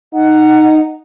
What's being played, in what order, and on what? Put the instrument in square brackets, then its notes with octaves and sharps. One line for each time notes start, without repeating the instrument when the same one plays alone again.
[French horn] D#4 [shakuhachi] F#5